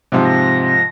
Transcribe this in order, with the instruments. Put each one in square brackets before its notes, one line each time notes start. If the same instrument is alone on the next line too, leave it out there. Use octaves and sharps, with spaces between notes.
[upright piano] G#2 F3 [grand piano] C3
[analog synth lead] A#6